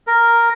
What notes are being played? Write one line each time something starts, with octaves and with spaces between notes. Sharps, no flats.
A#4